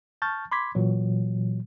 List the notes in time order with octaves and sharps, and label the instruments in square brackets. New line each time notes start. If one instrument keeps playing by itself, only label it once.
[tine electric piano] A5 C#6 F6 G6 A6
B5 C6 D6 G#6 B6
A#2 E3 F#3